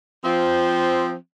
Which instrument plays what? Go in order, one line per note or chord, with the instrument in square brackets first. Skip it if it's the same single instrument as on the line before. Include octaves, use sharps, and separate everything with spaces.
[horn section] F3 C4